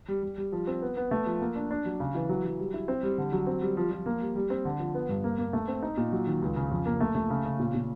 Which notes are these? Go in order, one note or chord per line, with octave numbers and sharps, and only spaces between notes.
G3
G3
G3
F3
C4
B3
B3
A3
F3
A#3
D4
D4
F#3
C#3
E3
F#3
F#3
G3
E4
C4
G3
D3
F#3
C4
G3
F3
F3
A#3
G3
G3
C4
D3
F3
B3
G2
A#3
A#3
A3
C4
D#4
A#2
F#3
D#3
C#2
C#3
F2
A#3
A3
A3
C#3
C#3
A#2
A#2